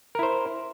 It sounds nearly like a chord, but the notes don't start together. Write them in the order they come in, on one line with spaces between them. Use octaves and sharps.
A#4 E4 C5